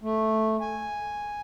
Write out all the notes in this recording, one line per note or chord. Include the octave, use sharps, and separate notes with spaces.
A3
G#5